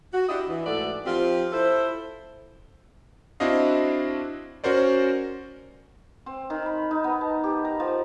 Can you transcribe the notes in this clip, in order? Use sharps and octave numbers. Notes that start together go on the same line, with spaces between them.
F#4
D4 E4 G4 D#5
E3
G#2 E3 A3 F#4 A4 D5
F3 C4 D#4 F4 G4
E4 A4 C5
C4 D4 E4 F#4 D#5 F5
C#4 F#4 A#4 C5 D5
C4
D#3
B5
D#4
B3
A5
G4
A#5
F3